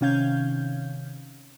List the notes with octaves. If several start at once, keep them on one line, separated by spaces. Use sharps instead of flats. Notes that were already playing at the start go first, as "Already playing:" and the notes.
C3 D#3 C#4 F5 G6 G#6